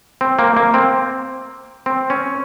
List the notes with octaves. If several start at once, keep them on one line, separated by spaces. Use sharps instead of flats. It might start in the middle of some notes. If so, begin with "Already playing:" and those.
C4
A#3
A#3
C4
C4
C#4